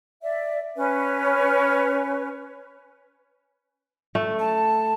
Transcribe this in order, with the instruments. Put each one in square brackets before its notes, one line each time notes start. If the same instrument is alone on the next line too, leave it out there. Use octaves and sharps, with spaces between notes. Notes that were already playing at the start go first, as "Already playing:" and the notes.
[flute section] D5 E5
C#4 B4
[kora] A3
[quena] A5